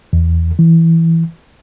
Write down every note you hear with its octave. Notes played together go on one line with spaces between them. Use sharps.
E2
E3